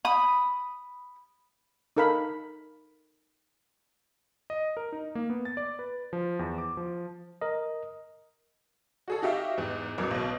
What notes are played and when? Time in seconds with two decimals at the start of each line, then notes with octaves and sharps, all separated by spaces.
0.05 B5 D#6
1.97 D#4 A4 A#4 F5 B5
4.50 D#5
4.77 A#4
4.92 D#4
5.15 A#3
5.30 B3
5.45 A6
5.57 D5
5.79 B4
6.13 F3
6.39 E2
6.58 D6
6.77 F3
7.41 A#4 D#5
9.08 F#4 G#4 A4
9.22 D#4 F#4 G4 E5 F5
9.58 E2 G#2
9.98 A1 E2 F#3 A#4
10.11 B1 B2